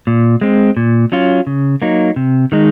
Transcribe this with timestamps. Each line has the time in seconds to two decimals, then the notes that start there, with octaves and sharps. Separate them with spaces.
0.07 A#2
0.41 G#3 C4
0.77 A#2
1.12 F#3 C#4 F4
1.47 C#3
1.82 F#3 A#3 D#4
2.16 C3
2.52 D#3 G#3 D#4